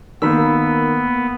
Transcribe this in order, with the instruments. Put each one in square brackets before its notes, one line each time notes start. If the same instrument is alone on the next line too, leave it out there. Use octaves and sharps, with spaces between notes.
[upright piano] D#3 A#4 B5 [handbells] A#3 E6 [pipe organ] B3